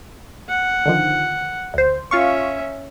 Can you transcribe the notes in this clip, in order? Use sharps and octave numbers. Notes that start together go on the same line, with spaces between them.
F#5
D3 D#3 F3
D2 C5
C#4 F4 E5 F5 C#6